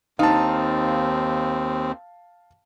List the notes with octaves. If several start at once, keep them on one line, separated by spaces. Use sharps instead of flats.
D#2 C4 D#4 F5 A5